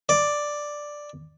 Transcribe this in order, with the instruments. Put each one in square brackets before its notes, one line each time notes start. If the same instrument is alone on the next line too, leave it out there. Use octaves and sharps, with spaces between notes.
[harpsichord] D5